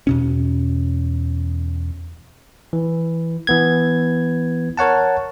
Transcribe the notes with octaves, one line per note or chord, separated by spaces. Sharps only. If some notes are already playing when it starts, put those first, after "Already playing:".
E2 B2 C#4
E3
E3 B3 G#6
A#4 C#5 F#5 A5